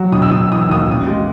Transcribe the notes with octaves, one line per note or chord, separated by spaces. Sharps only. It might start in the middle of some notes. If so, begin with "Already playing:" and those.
Already playing: F#3
E1 D#6
E6
E1 D#6
E6
E3 D#6
E6
D#2 D#6
E6
A1 D#6
G#3